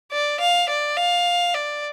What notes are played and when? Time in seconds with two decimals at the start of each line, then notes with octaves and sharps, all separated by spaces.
0.12 D5
0.40 F5
0.69 D5
0.97 F5
1.54 D5